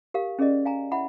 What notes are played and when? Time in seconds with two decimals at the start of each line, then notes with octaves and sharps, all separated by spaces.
0.14 G4 A#4 F5
0.39 C#4 G#4 A#4 D5 D#5
0.65 F5 G#5 A#5
0.91 E4 E5 F#5 B5